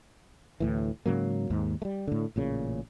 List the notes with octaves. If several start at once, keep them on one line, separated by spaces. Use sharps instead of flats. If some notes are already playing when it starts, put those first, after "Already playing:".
D2 A2 E3
G#2 C#3 F#3 A#3
D#2 G#2
G3 A3
A2 D3
A1 A#2 C#3